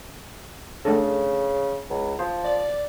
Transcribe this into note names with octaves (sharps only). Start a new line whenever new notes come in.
C#3 A3 D4 A4
C#2
F3 C5
D5